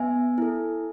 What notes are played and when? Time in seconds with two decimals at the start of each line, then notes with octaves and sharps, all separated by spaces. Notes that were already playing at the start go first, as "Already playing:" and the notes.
Already playing: B3 E5 G#5
0.38 E4 A4